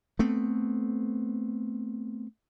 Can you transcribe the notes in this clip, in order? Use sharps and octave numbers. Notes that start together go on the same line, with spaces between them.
A3 B3 C4